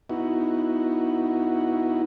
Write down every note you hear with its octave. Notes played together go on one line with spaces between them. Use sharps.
B3 D#4 E4 F#4